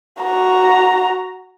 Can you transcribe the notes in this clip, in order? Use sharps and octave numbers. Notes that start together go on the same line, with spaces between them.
F#4 A#5